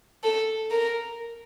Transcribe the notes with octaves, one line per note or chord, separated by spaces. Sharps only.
A4
A#4